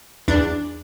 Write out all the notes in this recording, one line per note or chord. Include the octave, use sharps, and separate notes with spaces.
E2 D4